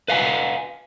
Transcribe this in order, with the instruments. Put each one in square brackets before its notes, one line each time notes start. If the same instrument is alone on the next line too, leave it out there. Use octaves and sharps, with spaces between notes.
[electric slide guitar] B4 F5 F#5 G#5